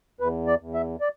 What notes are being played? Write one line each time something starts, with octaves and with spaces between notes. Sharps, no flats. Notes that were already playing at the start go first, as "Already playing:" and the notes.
E2 B4
D5
E2
E5
D5